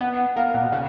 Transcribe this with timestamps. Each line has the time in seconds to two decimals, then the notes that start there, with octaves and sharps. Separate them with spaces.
0.01 B3 F#5
0.36 A#3 F5
0.54 A#2 F#5
0.63 B2
0.72 C#3 F#5